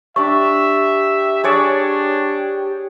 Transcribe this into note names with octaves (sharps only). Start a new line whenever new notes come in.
D4 G4 D5 E5 C#6
D4 G#4 C#5 D5